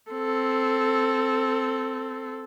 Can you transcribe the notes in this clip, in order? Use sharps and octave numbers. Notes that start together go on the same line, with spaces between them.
C4 A4